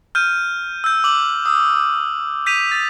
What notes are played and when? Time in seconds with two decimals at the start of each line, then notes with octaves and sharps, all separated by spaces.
0.15 F6 G6 D#7
0.84 E6 G6
1.04 D6 F#7
1.46 D#6 E6
2.46 G6 B6 D#7 F7
2.71 A6